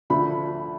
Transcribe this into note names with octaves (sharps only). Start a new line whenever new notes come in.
D2 D3 F3 A3 B5